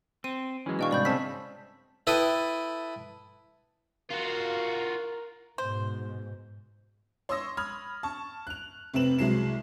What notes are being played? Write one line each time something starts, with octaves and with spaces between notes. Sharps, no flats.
C4 D#7
E3 F#3 G#3 C#4
B2 D4 D#5 F5 G5 C#6
C2 G#2 D5 B5 G6
C#3 C4 A5 E6 B6
E4 A4 B4 G5 D#6
F4 F#4 A#4
G#2 B2 C5
C#5 C6 C#6 D#6 E6 A#6
B5 D#6 F6 G#6
A5 C#6
F#6 F7
F1 C3 C4 B4 E7 F#7
C2 F#3 G#3 C7 E7